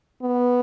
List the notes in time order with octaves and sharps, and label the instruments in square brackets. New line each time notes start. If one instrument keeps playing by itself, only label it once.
[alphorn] B3